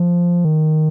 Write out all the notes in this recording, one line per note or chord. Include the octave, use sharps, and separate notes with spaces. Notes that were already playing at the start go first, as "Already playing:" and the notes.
Already playing: F3
D#3